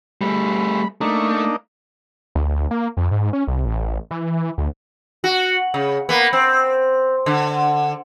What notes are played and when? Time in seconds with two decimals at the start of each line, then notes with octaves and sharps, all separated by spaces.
0.21 G3 A3 B5
1.01 A3 A#3 D4 D#4
2.35 D2
2.71 A#3
2.97 F2
3.11 G#2
3.33 C#4
3.48 C2
3.66 A1
4.11 E3
4.58 D2
5.24 F#4
5.74 C#3
6.09 A#3 B3
6.33 C4
7.26 D3